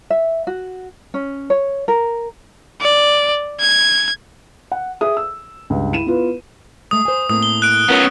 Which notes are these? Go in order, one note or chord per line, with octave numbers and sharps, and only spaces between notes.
E5
F#4
C#4
C#5
A#4
D5
G#6
F#5
G#4 E5 D#6
E6
C#2 G2
E4 D#7 E7
B3 E4 F4 B4
G#3 A3 D#6
C5 G#5
A2 A#3 C4 D#6
G7
F#6 D7
B3 C#4 F4 A#4